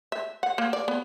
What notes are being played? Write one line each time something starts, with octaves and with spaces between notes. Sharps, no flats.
E5
F#5
A#3
D5
B3